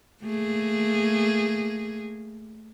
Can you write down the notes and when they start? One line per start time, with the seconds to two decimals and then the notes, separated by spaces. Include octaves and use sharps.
0.23 A3 A#3 G#4